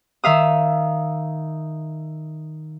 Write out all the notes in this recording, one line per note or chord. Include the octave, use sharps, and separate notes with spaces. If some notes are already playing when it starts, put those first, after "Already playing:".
D#3 E5 F5 D#6